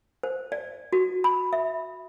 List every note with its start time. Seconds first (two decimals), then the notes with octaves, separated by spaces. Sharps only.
0.23 C5
0.52 D5
0.93 F#4
1.24 B5
1.53 E5